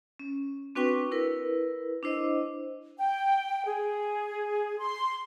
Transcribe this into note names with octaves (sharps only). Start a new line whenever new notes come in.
C#4
C4 D4 F#4 B4 G5 C#6
E4 A#4 B4
D4 E4 C5 D#5
G5
G#4
C6